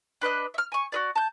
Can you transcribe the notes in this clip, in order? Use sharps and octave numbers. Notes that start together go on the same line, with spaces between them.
D4 B4 D#5 F#6
E5 F6
G#5 C#6
F#4 G#4 D5
A5 G6